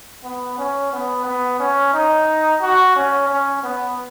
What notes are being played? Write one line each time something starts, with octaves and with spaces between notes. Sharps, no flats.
B3
C#4
B3
B3
C#4
D#4
F#4
C#4
C#4
B3